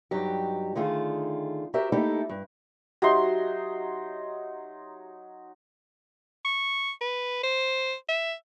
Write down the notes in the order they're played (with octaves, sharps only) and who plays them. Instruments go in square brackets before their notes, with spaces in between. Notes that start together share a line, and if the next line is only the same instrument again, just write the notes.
[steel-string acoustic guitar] G2 F#3 D#4 G4
D3 D#3 A3 F4 G#4
F#4 G4 A#4 C5 E5
A3 A#3 D#4 E4 G4 A4
G2
[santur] F#3 D#4 C6 [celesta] F#4 G4 E5
[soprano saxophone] C#6
B4
C5
E5